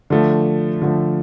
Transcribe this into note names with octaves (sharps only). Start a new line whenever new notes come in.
D3 F3 A3
D3 F3 A3